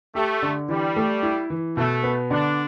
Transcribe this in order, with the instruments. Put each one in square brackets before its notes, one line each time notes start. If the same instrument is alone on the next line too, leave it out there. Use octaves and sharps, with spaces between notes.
[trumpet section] A3 [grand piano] G4
[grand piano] D3
[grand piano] E3 [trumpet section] G3
[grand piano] A3
E4
E3
[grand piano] B2 [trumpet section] A3
[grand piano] B3
[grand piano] D3 [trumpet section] D4